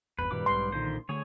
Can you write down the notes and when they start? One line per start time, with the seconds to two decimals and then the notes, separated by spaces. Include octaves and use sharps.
0.19 G1 E2 B4
0.31 F#2 A#2 D#3 G3 B4 D6
0.46 B1 G#2 C6
0.72 B1 A#2 D3 D#3 C5
1.09 D3 A3 G#4 C#5